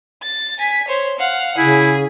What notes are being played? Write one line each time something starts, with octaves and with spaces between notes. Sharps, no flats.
A6
G#5 B6
C5 C#5
F5 F#5
C#3 E4 G#4